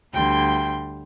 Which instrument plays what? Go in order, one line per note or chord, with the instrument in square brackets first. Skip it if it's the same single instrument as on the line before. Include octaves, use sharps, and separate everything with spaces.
[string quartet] D2 D3 G3 G5 C6